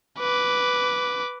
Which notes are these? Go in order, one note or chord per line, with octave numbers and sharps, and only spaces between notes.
B4 D6